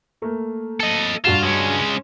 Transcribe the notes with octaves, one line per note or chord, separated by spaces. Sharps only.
A3 A#3 A#4
A4 D#5
G2 F4 F#4 E7
G#3 C#4